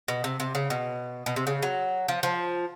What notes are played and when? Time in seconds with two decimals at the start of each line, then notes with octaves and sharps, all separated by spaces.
0.08 B2
0.24 C3
0.40 C3
0.55 C#3
0.70 B2
1.26 B2
1.36 C3
1.47 C#3
1.63 F#3
2.08 F3
2.23 F3